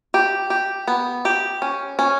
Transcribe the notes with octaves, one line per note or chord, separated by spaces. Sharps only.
G4
G4
B3
G4
C#4
C#4